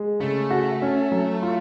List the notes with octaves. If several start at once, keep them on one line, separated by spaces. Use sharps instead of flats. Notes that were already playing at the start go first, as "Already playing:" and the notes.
Already playing: G#3
C#3 A3
F#4
C#4
F#3
F4